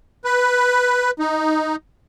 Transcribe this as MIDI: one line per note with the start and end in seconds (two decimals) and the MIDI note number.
0.25 1.11 71
1.19 1.76 63